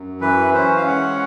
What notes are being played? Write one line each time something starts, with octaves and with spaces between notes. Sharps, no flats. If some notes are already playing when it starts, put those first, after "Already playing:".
Already playing: F#2
E3 B4
C#4 C5
F5
G#3 F#5